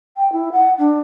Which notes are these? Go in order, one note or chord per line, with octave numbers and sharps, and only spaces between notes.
G5
E4
F#5
D4